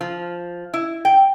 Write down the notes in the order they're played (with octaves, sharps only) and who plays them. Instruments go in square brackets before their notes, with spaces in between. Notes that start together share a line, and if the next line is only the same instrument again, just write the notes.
[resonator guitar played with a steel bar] F3
E4
G5